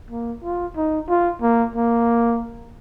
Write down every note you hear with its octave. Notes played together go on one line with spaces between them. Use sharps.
A#3
F4
D#4
F4
A#3
A#3